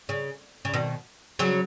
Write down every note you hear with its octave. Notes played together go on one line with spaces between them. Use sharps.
C#3
C#3
B2 D#3
C#3 F#3